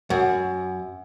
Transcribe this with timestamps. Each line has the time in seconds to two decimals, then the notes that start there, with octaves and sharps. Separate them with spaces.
0.10 F#2